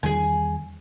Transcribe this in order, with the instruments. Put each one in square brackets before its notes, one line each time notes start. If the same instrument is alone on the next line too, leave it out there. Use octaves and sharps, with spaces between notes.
[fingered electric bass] E2 D#3 G3 [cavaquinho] G#4 G#5